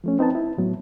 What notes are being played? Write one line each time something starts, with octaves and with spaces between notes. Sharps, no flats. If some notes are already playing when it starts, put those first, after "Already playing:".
F3 A3 C#4
C4 D#4 B4 A5
E4
A2 F#3 B3